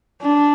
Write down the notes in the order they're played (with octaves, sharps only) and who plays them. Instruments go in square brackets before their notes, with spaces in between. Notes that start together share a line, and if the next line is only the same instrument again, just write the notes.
[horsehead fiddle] D4